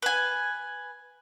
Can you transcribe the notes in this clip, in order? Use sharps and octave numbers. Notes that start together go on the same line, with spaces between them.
B4 G#5